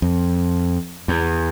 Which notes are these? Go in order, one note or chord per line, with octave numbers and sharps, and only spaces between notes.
F2
E2